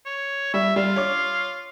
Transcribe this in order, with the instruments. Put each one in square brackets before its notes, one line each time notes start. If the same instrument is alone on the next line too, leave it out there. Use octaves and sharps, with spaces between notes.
[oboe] C#5
[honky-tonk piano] G3 [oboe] E5
[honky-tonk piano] G3 [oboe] F4
[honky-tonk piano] C#5 D6